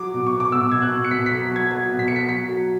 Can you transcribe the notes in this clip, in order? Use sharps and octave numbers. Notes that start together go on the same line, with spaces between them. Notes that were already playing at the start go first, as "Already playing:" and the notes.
Already playing: F#3 D6
B2
C#6
B2
D6
B2 E6
B2 G#6
F#6
B2
C#7
B2 B6
F#3 B6
B6
F#3 G#6
F#3 G#6
B2
B6
F#3 C#7
B6
F#3 B6
F#3